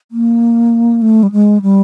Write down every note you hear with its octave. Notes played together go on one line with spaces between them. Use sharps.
A#3
A3
G3
G#3
G3